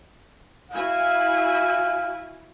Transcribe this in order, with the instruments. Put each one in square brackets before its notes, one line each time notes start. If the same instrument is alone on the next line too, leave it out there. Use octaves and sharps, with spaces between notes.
[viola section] E4 F#4 G#5 [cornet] F5